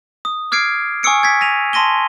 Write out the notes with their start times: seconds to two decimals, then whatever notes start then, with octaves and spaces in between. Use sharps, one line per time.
0.25 D#6
0.52 D6 F6 G#6 C7 D7
1.03 G#5 C#6 D#6 E6 C#7 D7
1.23 G#6 A6 B6
1.41 A#6 D#7 F7
1.73 A5 C6 A#6 D#7 G7